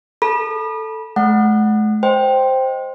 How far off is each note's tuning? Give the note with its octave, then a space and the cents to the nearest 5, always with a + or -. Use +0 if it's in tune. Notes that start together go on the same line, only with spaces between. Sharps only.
A4 +0 B5 -30
A3 -45 F#5 +0
C5 +0 D#5 +0 G5 +0